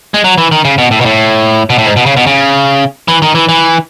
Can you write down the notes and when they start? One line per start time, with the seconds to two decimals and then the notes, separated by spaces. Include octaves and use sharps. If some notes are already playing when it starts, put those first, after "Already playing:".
0.14 G#3
0.24 F#3
0.38 E3
0.52 D#3
0.65 C#3
0.78 B2
0.91 A2
1.01 B2
1.05 A2
1.70 B2
1.78 A2
1.86 G#2
1.96 B2
2.06 C#3
2.17 B2
2.27 C#3
3.08 E3
3.22 D#3
3.35 E3
3.49 E3